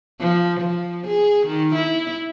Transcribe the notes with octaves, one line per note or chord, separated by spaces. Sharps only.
F3
F3
G#4
D#3
E4